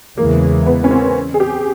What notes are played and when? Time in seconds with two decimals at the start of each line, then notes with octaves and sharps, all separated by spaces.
0.18 E2 C#3 E3 G#3 A#3
0.66 B3
0.84 C#4
0.91 C4
1.34 G#4
1.40 G4